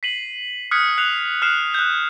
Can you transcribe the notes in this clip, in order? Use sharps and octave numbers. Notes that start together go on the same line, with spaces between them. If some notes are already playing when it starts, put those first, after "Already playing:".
B6 C7 D#7 F#7
D#6 F6 F#6 G#6 B6 C#7
F#6 C7 C#7 F7
F6 F#6 C7 E7
F#6 G6